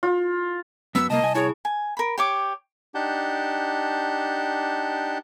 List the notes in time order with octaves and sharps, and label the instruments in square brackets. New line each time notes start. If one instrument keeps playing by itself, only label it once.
[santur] F4
[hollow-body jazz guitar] F#2 B3 [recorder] E6
[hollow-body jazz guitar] C2 A#3 [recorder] D#5 [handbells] A5
[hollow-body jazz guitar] C2 G#5
[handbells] E4 G#4 C#6 [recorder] C#5
[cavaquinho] G#5
A#4 B5
G4 C#5 D6
[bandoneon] D4 D#4 G4 F#5 A5 G6